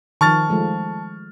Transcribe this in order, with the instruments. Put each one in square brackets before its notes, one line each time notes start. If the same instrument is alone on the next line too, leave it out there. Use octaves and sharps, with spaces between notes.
[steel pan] D#3 F3 [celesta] A5 [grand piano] C#6 F6 A6
[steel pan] F3 G#3 A3